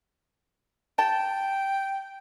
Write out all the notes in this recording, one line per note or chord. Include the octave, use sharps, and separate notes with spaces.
G5 A5